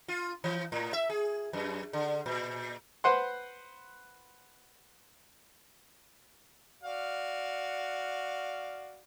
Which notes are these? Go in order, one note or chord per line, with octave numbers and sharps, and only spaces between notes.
F4
E3
A2
E5
G#4
F#2
D3
A#2
B4 C5 F#5 C6
F#4 D5 F5